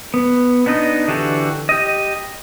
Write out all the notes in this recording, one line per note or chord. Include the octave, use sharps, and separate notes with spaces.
B3
B3 D4 D#4 D#5
D3 E3 F#4 G4 A5
G4 D#5